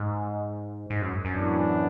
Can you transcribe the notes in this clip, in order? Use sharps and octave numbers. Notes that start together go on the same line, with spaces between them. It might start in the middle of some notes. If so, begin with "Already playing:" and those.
Already playing: G#2
G#2
F#2
F#2
A2 E3 B3 D4